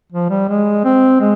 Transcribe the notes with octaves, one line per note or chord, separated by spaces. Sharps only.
F3
G3
G#3
C4
G#3